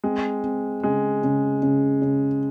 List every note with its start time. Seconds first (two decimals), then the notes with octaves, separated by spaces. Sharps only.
0.04 G#3 C4
0.44 C4
0.83 C#3 G#3
1.23 C#3
1.63 C#3
2.02 C#3